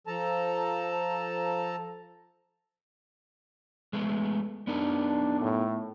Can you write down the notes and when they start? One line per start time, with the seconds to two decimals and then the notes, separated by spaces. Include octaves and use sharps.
0.07 F3 A4 A5 A#5
3.93 G#3 A3 B3
4.67 B3 D4 D#4 A#4
5.41 A2